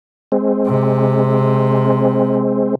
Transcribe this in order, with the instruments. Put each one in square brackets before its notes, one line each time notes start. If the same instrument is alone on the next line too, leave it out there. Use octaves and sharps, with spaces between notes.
[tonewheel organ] G#3 C4
[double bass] C3